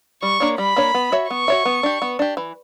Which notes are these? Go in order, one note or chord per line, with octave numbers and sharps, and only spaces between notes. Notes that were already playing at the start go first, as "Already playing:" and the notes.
G3 C#6
A#3 D4 A#4 C#5
G3 B5
A#3 D4 A#4 C#5
B3
F#4 C#5 E5
B3 C#6
F#4 C#5 E5
B3
D4 G4
B3
D4 G4
E3